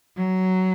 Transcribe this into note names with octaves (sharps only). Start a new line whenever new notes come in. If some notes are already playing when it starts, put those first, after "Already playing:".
F#3